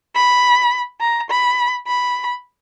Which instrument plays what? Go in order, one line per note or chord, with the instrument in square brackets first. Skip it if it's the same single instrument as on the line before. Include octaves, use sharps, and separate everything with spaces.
[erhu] B5
A#5
B5
B5